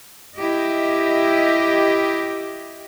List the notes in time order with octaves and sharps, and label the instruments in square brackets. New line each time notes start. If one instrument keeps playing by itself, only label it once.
[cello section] E4 G4 D#5